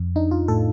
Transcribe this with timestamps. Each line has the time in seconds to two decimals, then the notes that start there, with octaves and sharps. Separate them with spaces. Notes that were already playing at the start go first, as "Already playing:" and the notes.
Already playing: F2
0.16 D4 D#4
0.31 F4
0.48 A2 A4